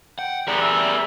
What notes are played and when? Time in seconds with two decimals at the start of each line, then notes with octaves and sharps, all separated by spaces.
0.19 F#5 G5
0.48 G3 B3 G#4 A#4 D5
0.61 E5